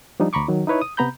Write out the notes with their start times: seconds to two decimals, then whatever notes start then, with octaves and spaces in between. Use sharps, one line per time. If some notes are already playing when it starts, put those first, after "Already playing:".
0.20 F3 G3 D4 D#4
0.33 D2 A#5 B5 C#6 D6
0.48 D#3 F#3
0.67 D#4 E4 B4 C#5
0.82 D#6
0.97 C3 B3 A#5 B5 G6